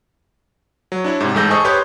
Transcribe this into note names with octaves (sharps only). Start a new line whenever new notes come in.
F#3
D4 E4 C#5
G#2 C3
A1 G#2 G#3 A4 G6 A#6
G#4 A4 C5 D#5 C#6 D#6
G4 B4 C#5 C6 D#6 G6